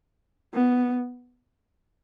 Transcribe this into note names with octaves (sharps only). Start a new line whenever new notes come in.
B3